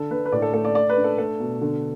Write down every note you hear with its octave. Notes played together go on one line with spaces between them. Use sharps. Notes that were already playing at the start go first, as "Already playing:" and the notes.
Already playing: D3 A4
D3 B4
B4
A2 D5
A4
A3 A4
D5
A3 D5
B4
D4
A4
A3 A4
B2
D3